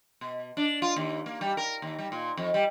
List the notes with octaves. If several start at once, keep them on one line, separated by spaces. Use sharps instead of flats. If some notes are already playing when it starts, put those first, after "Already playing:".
B2
D4
F4
D#2
A#3
G3
A#4
D#2
G3
A#2
F2
G3